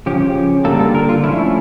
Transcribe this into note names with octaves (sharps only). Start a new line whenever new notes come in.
C#3 F3 C#4 G4
G4
D3 G3 A#3 A4
A4
A#4
F4
F3 A3 C#4 E4